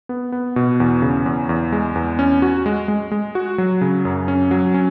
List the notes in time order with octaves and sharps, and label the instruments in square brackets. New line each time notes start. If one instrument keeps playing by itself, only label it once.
[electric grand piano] B3
B3
B2
E2
C#3
E2
E2
G#3
E2
C#4
F#4
G#3
G#3
G#3
F#4
F#3
C#3
F#2
C#4
F#3
C#4